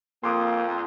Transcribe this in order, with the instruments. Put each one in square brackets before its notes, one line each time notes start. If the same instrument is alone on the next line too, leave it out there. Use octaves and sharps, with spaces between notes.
[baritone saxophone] F2 [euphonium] A#3 [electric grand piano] C6 D6 D#6